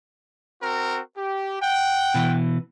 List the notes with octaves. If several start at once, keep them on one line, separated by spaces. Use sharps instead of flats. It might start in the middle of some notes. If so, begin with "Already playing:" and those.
C4 F#4 A#4
G4
F#5 G5
B2 E3